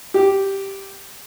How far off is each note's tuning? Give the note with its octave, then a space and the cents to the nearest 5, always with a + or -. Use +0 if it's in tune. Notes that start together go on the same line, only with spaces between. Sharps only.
G4 -5